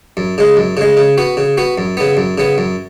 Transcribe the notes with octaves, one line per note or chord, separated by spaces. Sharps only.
F#2
C#3 G#3
F#2
C#3 G#3
C#3
B3 F#4
C#3
B3 F#4
F#2
C#3 B3
F#2
C#3 B3
F#2